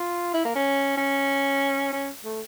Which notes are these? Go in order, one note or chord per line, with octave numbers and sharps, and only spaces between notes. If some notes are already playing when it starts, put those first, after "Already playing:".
Already playing: F4
E4
A#3
C#4
C#4
C#4
A3